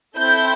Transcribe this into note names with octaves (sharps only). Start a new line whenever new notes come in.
C4 E4 A4 G6